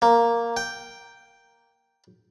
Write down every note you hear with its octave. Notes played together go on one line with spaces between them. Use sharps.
A#3
G5